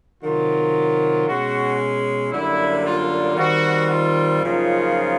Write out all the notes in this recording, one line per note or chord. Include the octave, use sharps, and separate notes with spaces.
C3 D#3 F#3 F4
B2 G#3 C#4 F#4
F#2 D3 G3 A#3 E4
F4
D#3 G3 C4 F#4
F4
F#2 C#3 F3 A#3 D#4 F4